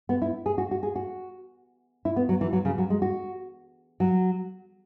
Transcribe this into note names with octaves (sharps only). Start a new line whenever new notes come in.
B3
E4
G#4
F#4
F#4
G#4
F#4
E4
B3
F#3
E3
F#3
C#3
F#3
G#3
F#4
F#3